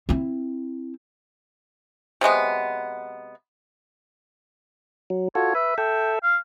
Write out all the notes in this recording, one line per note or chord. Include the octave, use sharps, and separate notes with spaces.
C4 E4
C3 F#3 G#3 B3
F#3
F4 F#4 A4 C#5
B4 E5
A4 E5 G5
F5